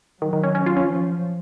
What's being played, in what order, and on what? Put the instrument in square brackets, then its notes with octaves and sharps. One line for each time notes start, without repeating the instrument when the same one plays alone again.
[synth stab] D#3 [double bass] F#3
[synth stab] D#3
C#4
C#4
F4
C#4
[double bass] F3